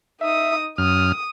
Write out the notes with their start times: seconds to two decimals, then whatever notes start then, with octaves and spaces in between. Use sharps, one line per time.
0.21 D#4 E5 D#6
0.78 F#2 D#6 F6